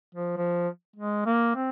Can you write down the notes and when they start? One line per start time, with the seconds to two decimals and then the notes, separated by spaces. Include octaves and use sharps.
0.15 F3
0.37 F3
0.96 G#3
1.26 A#3
1.55 C4